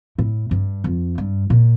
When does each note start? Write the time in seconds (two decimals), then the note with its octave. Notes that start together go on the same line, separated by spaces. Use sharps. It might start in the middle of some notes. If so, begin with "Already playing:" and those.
0.18 A2
0.51 G2
0.84 F2
1.18 G2
1.50 A#2